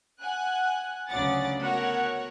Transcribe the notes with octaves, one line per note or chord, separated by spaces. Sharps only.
F#5 G#5 F#6
D2 C#3 F#3 D5 F#5 A6
A3 B3 F#4 A#4 C#5 F#5